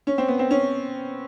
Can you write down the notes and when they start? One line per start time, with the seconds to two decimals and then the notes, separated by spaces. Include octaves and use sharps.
0.07 C#4
0.18 C4
0.28 B3
0.39 C4
0.51 C#4